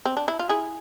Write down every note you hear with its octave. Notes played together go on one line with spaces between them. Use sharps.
C4
D4
E4
F4
E4 G#4